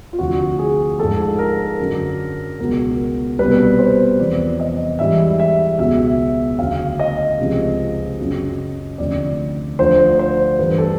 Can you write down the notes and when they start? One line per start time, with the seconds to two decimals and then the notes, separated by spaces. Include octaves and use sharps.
0.13 F4
0.19 D2 C3 F3 F#4
0.59 G#4
0.99 G#2 F3 A4
1.39 A#4
1.80 F#2 D3 F#3
2.59 C#2 B2 F#3 A#4
3.39 C2 B2 G3 B4
3.79 C5
4.19 E2 C3 F3 D5
4.60 D#5
4.99 G#2 E3 G3 E5
5.40 E5
5.78 C#2 B2 F#3 E5
6.59 D2 C#3 F#3 F5
7.00 D#5
7.38 C#2 C3 F3
8.19 F#2 C#3 F#3
8.98 D2 C3 F3 D5
9.79 D2 D3 F3 C5
10.19 C5
10.58 G2 E3 G3 B4
10.78 A4